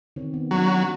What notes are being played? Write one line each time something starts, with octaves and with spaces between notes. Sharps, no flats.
D#3 C4 C#5
B3
F#3 C#4 D4